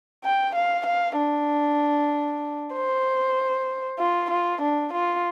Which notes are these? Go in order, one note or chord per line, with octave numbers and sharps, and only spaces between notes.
G5
F5
F5
D4
C5
F4
F4
D4
F4